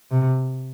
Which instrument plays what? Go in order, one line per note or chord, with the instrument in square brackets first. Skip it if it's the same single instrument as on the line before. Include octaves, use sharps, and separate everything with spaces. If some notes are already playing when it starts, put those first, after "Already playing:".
[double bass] C3